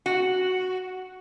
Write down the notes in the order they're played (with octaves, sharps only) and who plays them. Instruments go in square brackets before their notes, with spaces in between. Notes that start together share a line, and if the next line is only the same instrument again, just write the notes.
[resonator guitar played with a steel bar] F#4